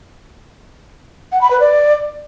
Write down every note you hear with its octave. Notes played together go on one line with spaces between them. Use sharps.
F#5
B5
B4
D5